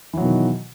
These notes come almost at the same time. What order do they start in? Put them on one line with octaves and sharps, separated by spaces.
E3 F#3 B2 D#3